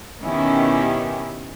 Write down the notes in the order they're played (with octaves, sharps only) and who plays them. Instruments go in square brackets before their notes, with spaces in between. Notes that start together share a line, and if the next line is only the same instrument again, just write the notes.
[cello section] B2 D#3 B3 C#4 E4 G4